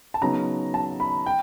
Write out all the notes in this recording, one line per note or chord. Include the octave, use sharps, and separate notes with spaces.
A5
C#3 F#3 B3 D#4 A#5
A5
B5
G5